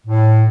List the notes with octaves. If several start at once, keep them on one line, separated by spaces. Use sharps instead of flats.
A2